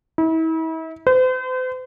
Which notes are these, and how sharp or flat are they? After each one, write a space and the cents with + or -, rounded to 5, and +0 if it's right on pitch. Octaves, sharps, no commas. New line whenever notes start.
E4 -40
C5 -40